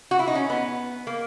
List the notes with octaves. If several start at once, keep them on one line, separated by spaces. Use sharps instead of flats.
F#4
E4
D#4
C#4
B3
A#3